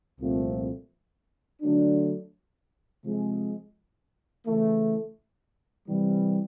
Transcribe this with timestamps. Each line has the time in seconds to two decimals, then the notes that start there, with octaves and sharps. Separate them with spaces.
0.20 C2 A#2 F3 A3 C4
1.62 D3 F#3 A3 D4
3.04 C3 F3 G#3
4.46 C#3 E3 A3
5.88 C3 E3 G3